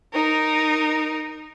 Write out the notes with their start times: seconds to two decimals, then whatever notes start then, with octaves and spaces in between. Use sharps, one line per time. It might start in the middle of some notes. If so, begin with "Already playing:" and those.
0.14 D#4 A#4